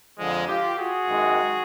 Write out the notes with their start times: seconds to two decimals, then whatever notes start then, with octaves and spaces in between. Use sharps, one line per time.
0.18 F2 D3 F3 G#3
0.47 F4 G4
0.77 F#4 G#4
1.07 F#2 D#3 G#3